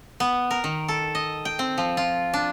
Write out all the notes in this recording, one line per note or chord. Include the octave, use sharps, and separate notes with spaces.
B3
A#4
D#3
A4
D#5
G5
C4
F3
F4
D4